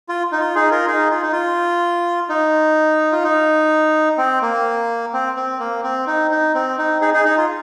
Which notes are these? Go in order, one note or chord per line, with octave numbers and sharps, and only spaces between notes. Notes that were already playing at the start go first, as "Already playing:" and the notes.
F4
D#4
F4
D#4 G#4
F4 A#4
D#4 G#4
F4
D#4
F4
D#4
F4
D#4
C4
A#3
C4
C4
A#3
C4
D#4
D#4
C4
D#4
D#4 G#4
D#4 G#4
D#4
F4